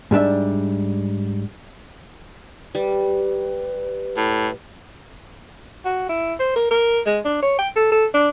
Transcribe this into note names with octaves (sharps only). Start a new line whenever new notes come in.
G#2 G3 D4 E5
G3 B4
A2
F#4
E4
C5
A#4
A#4
G#3
D4
C#5
G5
A4
A4
D4